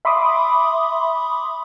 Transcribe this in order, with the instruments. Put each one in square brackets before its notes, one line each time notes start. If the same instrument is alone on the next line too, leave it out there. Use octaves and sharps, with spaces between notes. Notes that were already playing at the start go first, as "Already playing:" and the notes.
[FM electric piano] E5 B5 C6 D6 D#6